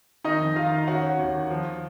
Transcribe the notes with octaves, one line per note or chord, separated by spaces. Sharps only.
D#3 D#4 D#5
F2
D#3 F4 F5
D#4
C#4 F#4 F#5
C#4
D#2
D#3
F3